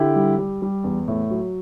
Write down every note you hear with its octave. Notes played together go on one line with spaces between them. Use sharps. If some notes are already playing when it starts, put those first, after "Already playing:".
Already playing: D3 E4 G4
G3
G3
G3
E2
A2
F#3